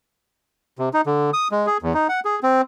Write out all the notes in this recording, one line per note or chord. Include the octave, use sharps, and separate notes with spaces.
C3
D#4
D3
D#6
G#3
G#4
E2
D#4
F#5
G#4
C4